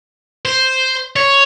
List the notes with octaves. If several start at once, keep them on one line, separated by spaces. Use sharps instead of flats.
C5
C#5